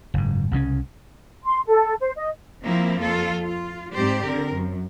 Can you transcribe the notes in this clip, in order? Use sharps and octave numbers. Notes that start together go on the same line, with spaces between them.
F#1 G#2
C2 C#3 E3 C#4
C6
A4
C5
D#5
F3 A#3 C4 E4
F2 F4 A4
F4
G#2 C4 G4 C5 D5
D3 C4 A#4
F#2